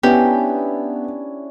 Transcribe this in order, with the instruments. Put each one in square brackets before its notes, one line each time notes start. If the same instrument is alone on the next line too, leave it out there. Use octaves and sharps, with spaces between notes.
[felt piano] B3 [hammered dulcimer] C#4 D4 E4 [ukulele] G4